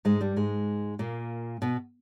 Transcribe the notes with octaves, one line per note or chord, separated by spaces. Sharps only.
G#2 G#3
G2 G3
G#2 G#3
A#2 A#3
B2 B3